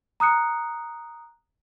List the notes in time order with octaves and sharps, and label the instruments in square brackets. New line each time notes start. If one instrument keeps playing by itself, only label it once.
[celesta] A#5 D#6 F#6 C#7